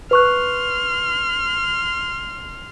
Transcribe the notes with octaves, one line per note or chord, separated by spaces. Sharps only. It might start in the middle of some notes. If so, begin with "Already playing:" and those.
B4 C6 C#6 F6 F#6